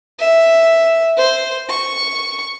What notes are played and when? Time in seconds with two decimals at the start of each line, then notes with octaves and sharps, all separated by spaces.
0.19 E5
1.17 C5
1.69 C#6